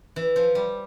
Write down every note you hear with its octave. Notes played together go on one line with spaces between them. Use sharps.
E3
F3
G3